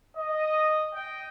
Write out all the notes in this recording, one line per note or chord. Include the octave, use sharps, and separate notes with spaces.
D#5
D#5 G5